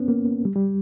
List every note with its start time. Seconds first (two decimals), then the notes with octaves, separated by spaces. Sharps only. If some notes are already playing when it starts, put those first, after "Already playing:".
Already playing: B3 C#4
0.08 A#3
0.45 G3
0.56 G3